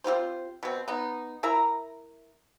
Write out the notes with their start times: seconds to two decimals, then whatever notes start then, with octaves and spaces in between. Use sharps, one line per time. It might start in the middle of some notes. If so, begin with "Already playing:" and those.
0.04 C4 F4 G4 C5
0.63 B2 C4
0.88 B3 D#4
1.43 E4 A#4 E5 A#5